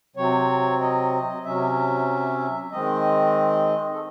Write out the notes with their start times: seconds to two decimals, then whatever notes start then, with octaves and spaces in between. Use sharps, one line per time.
0.16 C3 F#3 C4 C#5
0.81 D#5
1.44 C3 F#3 C#4 E5
2.72 D#3 G#3 C4 D#5
3.91 A4